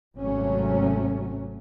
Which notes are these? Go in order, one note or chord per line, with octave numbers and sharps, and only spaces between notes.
G#1 C3 F#3 A3 C#4